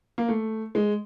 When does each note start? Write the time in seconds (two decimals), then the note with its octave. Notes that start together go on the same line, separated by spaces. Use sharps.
0.18 A#3
0.28 A3
0.75 G#3